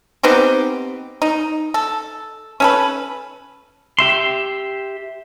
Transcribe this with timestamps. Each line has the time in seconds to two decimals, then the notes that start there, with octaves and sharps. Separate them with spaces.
0.23 B3 C4 D#4 G4
1.22 D#4
1.74 A4
2.60 C#4 A4 B4
3.99 G4 E5 C6